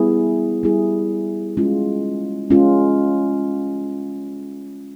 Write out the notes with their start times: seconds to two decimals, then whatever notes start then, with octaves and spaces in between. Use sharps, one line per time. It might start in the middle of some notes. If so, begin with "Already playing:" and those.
Already playing: G3 B3 E4 G#4
0.63 G3 B3 E4 G#4
1.57 G#3 C#4 F4
2.50 G#3 C#4 F4